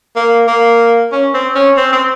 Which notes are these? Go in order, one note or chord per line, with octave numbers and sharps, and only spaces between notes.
A#3
A#3
C#4
C4
C#4
C4
C4